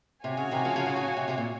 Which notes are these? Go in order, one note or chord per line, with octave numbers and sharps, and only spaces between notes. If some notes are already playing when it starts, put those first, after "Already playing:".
C3 F#4 C#5 F5 G#5
C#3
C3 D#3
C#3 F3
C#3 F3
C#3 F3
C#3
C#3
C3
C3
A#2